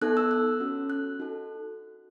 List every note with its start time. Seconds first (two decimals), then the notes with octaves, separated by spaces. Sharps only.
0.01 B3 D#4 A4 F#6
0.17 E6
0.31 F#6
0.60 C#4 F#4 A4
0.90 F#6
1.20 D#4 F#4 A4